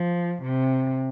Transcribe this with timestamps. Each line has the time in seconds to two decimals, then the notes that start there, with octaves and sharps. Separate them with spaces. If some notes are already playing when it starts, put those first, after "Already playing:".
Already playing: F3
0.43 C3